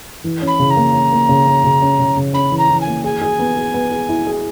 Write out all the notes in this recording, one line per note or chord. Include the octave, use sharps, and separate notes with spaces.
E3
C#4
B5
C#3
A#5
A#3
C#4
A#3
C#3
C#4
C#3
C#4
C#3
C#3
C#4 B5
E3
A#5
E3
G#5
A#3
G#4 G#5
G#4
B3
G#4
B3
G#4
E4
G#4